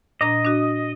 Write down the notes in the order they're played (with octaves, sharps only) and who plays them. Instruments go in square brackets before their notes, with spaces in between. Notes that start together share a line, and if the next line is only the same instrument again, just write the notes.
[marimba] A#2 D4 A#5 [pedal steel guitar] D#5
[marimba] D4 F#4